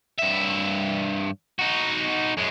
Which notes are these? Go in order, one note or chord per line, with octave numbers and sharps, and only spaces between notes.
G2 E5
D#4 F#4
F#2 G#3